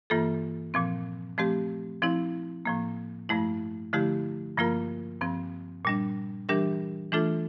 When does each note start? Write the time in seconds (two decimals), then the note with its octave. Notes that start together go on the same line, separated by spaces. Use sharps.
0.10 G2 E3 A#3 F4 A4
0.74 A#2 F3 C4
1.38 F3 A3 C4 G4
2.02 F3 C4 E4
2.65 A2 F3 A#3
3.29 G2 F3 A3 E4
3.93 D3 F3 A3 E4 G4
4.57 G2 F3 A#3 F4 A#4
5.21 G2 F3 C4
5.85 A#2 G3 D4
6.49 E3 G3 D4 G4 A#4
7.12 E3 A3 D4 F4 A4